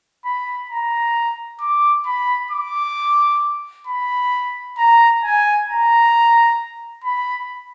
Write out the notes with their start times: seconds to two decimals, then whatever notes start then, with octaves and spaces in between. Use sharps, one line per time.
0.25 B5
0.70 A#5
1.61 D6
2.06 B5
2.51 D6
3.87 B5
4.78 A#5
5.23 G#5
5.69 A#5
7.04 B5